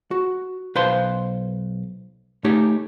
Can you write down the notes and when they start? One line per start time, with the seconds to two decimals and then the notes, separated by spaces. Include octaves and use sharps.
0.11 F#4
0.75 B1 B4 C5 F5 C6
2.44 A3 D#4 G4 C#5